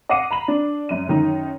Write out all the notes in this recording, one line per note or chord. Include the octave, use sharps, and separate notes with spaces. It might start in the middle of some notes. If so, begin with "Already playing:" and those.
D#5 F5 F#5 D6 C7 D#7
A#5 B5 F#7
D4
F#2 D#7
F#2 D#3 D#4